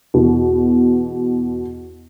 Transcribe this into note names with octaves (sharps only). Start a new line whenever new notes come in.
E2 B2